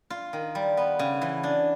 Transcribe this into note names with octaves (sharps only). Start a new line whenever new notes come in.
F4
D#3
G3
B3
C#3
E3
D4